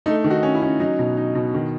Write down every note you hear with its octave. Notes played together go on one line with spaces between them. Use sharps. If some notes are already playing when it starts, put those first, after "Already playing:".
A3 D#4
D#3
D#4 F#4
C#4
E4
C#4
F#3 D#4
B2
D#4
B2
D#3